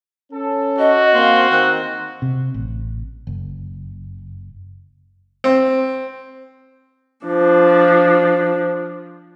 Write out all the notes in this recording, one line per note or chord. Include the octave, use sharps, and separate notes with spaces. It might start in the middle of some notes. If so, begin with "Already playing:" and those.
C#4 A4
F#4 D#5
A#3 C4 F5 C6
D#3 C4 F#6
C3
A1
F#1
C4
F3 D4